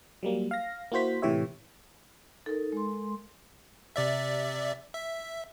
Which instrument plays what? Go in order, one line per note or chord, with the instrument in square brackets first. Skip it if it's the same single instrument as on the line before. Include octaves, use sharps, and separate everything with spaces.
[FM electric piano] F#3 G3 A#3
F5 A#6
A#3 E4 F#4 C5 B6
A2 C3 E3 G4 C#5 E5
[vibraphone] D#4 [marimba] A4 A#4
[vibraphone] G#3 C6
[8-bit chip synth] C3 D5 E5
E5